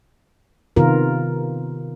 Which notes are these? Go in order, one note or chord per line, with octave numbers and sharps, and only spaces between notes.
C3 D#3 B3 F4 A#4